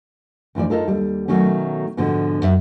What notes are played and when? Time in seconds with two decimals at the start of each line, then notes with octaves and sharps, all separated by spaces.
0.55 D2 E3 F3 C5 D5
0.70 D#4 F4 A4 A#4
0.88 D#2 G3
1.28 B2 D#3 F#3 A3 C#4
1.97 G#2 B2 D3 F3
2.42 F#2 E5